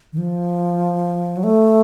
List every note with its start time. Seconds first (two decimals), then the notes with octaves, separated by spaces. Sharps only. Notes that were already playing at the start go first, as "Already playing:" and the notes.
0.13 D#3
0.18 F3
1.37 F#3
1.43 A3